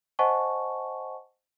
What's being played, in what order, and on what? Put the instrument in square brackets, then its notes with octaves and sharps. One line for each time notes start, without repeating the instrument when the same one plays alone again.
[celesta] C5 D#5 F#5 G#5 A5 C#6